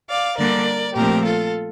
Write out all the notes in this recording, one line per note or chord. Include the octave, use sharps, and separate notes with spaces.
D5 F5
D3 G3 A#3 D4 A#4 D5
A#2 F3 A3 C4 G4 A#4
F4 A4